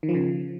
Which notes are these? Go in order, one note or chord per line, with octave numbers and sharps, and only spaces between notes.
D#3
F3
C#3